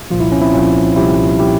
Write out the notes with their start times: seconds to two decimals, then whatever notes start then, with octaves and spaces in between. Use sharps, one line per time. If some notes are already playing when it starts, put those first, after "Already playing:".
0.10 C2 A#2 F3 F4
0.20 E4
0.32 C#4
0.41 C4 E4
0.53 C2 A#2 F3 C#4 F4
0.96 C2 A#2 F3 E4 G4
1.39 A#2 F3 E4 G4